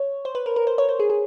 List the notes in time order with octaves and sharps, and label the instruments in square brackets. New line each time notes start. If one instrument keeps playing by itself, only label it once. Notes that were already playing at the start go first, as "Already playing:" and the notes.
Already playing: [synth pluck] C#5
C5
B4
A#4
A#4
C5
C#5
C5
G#4
G#4